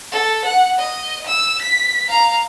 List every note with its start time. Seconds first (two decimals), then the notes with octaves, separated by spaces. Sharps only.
0.12 A4
0.45 F#5
0.78 D#5
1.27 E6
1.62 B6
2.09 F5 A#5